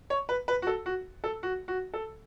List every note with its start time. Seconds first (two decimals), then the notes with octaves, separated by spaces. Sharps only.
0.10 C#5
0.29 B4
0.48 B4
0.62 F#4
0.67 A4
0.86 F#4
1.24 A4
1.43 F#4
1.68 F#4
1.94 A4